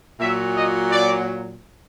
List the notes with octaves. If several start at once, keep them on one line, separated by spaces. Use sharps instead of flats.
A#2 F#3 E5
D#5
D5